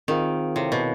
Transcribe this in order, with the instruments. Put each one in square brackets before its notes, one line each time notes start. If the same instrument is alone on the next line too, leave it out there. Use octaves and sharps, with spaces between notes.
[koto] D#3 [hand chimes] C4 F4 G#4 C5 F5
[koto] C3 [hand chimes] C4 E4 A4 C#5 F5
[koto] B2